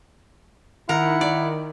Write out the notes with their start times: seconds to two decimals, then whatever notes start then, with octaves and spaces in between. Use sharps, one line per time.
0.89 D#3 E4 A#4 F#5
1.21 D5